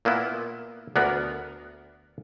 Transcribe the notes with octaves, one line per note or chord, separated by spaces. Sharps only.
A#2 A#3 B3 E4
D2 B3 D4 A#4 F#5